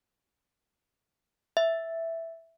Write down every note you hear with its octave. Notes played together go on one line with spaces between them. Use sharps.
E5